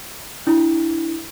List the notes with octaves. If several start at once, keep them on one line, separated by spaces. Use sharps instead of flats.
D4 E4